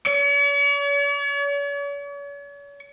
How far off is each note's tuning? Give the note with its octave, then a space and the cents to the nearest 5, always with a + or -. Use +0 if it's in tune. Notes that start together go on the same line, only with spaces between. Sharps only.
C#5 +45